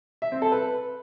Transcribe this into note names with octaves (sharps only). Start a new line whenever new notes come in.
E5
C4
A4
B4